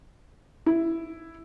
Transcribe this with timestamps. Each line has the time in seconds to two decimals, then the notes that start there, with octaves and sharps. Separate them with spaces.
0.66 E4